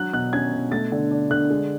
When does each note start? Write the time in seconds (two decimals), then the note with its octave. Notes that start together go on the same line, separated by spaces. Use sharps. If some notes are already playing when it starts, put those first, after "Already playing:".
Already playing: F#3 F#6
0.13 B2 F#6
0.33 C#4 G#6
0.52 B2
0.72 A3 A6
0.92 D3
1.11 D4
1.30 D3 F#6
1.50 G#3